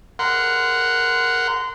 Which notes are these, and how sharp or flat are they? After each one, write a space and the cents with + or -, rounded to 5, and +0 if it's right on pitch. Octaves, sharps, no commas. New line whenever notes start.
A#4 +0 F#5 +0 C6 -25